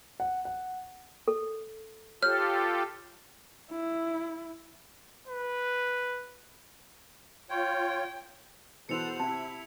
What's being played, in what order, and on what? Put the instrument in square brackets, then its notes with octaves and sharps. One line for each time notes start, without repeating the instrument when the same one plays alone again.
[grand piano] F#5
F#5
[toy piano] A4
[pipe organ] F4 G4 A4 [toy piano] C#5 [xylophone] F6
[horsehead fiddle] E4
[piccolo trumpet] B4
[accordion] F4 C#5 [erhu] G5
[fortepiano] B2 E3 [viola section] A4 C5 F#5 [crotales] C#7 F7
[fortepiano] C3 [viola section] E4 [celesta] A5